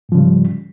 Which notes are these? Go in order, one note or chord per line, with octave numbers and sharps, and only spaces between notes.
G#2 C#3 F3 G3